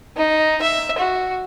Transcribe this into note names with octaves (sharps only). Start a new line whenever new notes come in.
D#4
E5
F#4